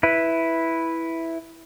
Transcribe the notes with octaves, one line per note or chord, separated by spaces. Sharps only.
E4 B4